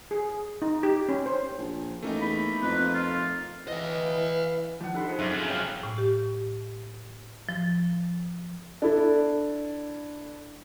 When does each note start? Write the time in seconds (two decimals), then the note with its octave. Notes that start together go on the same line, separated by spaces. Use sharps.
0.11 G#4
0.62 D#4
0.83 G4
1.09 C#4
1.26 C5
1.58 A#1
2.03 A1 A3 A#3 D#4
2.21 E2 B5
2.62 F2 B4
2.94 F4
3.68 E3 D#5 F5
4.81 D#3 F3 D4 F#5
4.94 D4 D#4 G4 A4 B5 C6
5.07 F3 G#3
5.19 F#2 D5 E5
5.31 F#2 F3
5.50 C#5 F5 G5
5.83 A2
5.98 G4
7.49 F3
8.82 D4 E4 A4